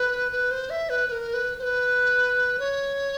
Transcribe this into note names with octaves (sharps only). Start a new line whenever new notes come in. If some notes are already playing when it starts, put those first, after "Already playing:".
Already playing: B4
B4
C5
E5
B4
B4
A#4
B4
C5
B4
C#5